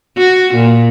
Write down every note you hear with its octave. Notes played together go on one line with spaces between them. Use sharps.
F#4
A#2